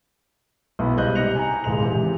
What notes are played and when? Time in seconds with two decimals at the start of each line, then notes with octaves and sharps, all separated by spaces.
0.79 B1 B3 E4 B5
0.96 C#2 G3 C5 D#5 F#6 G6
1.15 C3 D#4 F#6 A#6 C#7 F7
1.35 G#5 A#5
1.64 D#1 C#2 G#2 G#3 F7
1.82 C3 E3